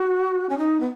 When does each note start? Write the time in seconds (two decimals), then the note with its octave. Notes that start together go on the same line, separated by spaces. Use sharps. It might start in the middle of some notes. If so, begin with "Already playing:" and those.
Already playing: F#4
0.50 C#4
0.58 D#4
0.80 B3